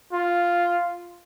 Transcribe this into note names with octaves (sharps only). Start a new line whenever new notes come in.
F4